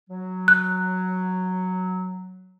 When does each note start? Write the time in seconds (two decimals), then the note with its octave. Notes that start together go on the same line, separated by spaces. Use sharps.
0.09 F#3
0.48 F#6